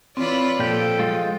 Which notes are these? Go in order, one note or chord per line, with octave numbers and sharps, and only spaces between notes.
E3 C4 F4 C#5 D5 B5
A#2 F3 G4 A4 G5
G#3 F4